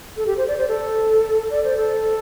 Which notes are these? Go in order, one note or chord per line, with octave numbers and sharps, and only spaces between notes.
A4
G4
C5
D5
C5
A4
D5
C5
A4